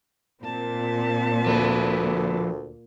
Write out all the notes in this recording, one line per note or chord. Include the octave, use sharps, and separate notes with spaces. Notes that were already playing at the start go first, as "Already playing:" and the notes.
A#2 C4 A5
D2 F3 B4